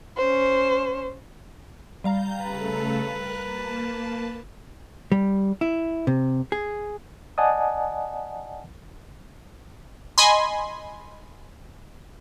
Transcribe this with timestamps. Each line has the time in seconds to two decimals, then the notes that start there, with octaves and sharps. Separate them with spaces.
0.18 C#4 C5
2.04 G3 F5 A#5 G6
2.42 C#3 A3 A4 B4
3.10 A#4 F#6
3.39 A#3 A5
5.12 G3
5.61 E4
6.07 C3
6.52 G#4
7.38 D5 D#5 F#5 G#5 A5 D#6
10.18 D#5 G#5 B5 C6